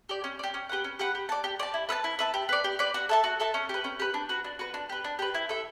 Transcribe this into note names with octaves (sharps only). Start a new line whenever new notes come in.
G4 D5
C#4
G4 D5
C#4
G4 B4 F#5
C#4
G4 B4 F#5
G4
D5 A5
G4
D5 A5
E4
B4 E5 A5
E4
B4 E5 A5
G4
B4 D5
G4
B4 D5
F#4
A4 E5 A5
F#4
A4 E5 A5
C#4
G4 B4
C#4
G4 B4
D4
F#4 B4
D4
F#4 B4
D4
G4 B4
D4
G4 B4
E4
A4 E5